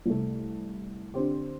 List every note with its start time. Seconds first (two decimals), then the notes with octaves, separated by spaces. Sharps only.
0.06 C2 C3 A3
1.14 D3 C4 G4